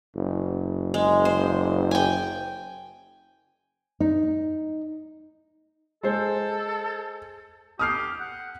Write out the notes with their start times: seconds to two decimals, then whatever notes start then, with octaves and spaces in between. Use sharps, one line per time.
0.15 F#1
0.94 G#3
1.25 C5
1.91 G5 G#5
4.00 D#4
6.03 G#3 A4 C5
7.79 G4 D#6 F6 C7
8.20 F#5